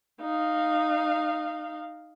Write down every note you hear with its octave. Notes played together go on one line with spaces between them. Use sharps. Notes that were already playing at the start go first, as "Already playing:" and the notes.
D#4 F5